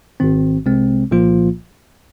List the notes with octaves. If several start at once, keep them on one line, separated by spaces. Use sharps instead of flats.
G#1 G#2 D#3 C4
C2 C3 G#3 C4
C2 A#2 F3 A#3 F4